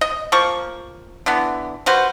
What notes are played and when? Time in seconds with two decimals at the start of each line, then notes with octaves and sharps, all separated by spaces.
0.01 D#5
0.32 F3 A#3 C#6
1.26 D3 E3 B3
1.86 G3 F#4 B4 C5